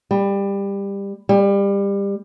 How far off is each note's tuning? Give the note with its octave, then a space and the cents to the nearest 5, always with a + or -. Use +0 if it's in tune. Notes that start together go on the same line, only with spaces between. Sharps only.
G3 +20
G3 +25